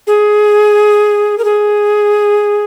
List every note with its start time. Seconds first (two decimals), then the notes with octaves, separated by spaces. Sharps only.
0.07 G#4
1.38 A#4
1.44 G#4